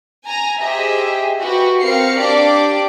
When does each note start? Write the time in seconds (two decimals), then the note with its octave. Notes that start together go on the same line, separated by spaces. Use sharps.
0.25 G#5 A#5
0.61 G4 G#4 C5 D#5 E5
1.41 F#4 G4 B4 G5
1.80 C4 A#4 F5 C7 C#7
2.20 D4 G4 D5 D6